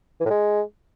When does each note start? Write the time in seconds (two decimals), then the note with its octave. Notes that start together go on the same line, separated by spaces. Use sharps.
0.20 E3
0.25 A2
0.30 G#3